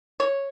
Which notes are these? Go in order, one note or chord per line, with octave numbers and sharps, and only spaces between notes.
C#5